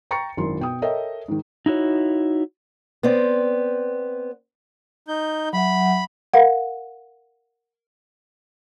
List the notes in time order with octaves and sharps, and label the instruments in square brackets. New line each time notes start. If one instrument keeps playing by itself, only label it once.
[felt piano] G5 A#5 C#6 A6 C#7
G#1 F#2 E4 A#4 C6
B2 G5 D#6
A4 A#4 C#5 D#5 E5 G5
G#2 D#3
[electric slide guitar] D#4 E4 F#4 C#5
[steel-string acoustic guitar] B3 C4 D5
[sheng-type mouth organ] D#4 G6
[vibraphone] F#3 E5 F#5 [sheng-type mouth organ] B5
[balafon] A#4 F5 F#5